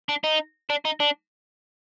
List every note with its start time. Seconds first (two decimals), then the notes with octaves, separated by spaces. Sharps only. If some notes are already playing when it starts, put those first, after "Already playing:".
0.09 D4
0.24 D#4
0.70 D4
0.85 D#4
1.00 D4